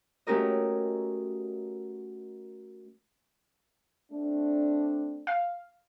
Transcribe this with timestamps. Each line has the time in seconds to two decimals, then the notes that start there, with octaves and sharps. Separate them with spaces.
0.27 A3 C#4 F#4 G4 A#4 D#5
4.12 A3 C4 D4
5.27 F5